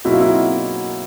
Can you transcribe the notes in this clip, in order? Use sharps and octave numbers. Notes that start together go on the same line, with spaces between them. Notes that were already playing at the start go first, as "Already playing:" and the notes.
B2 F#3 A#3 D#4 E4 F#4
F4
E4